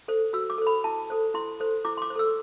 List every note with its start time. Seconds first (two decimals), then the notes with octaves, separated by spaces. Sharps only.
0.08 A4 C5
0.33 F#4 E6
0.50 D6
0.58 A4 C5
0.67 B5
0.84 E4 A5
1.10 A4 C5
1.34 E4 C6
1.60 A4 C5
1.85 E4 D6
1.97 C6
2.02 D6
2.10 C5
2.16 A4 E6